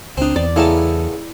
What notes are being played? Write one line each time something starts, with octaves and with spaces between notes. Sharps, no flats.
C#2 C4 D4 D#4
E2 D5
C#3 A3 B3 E4 A#4 A5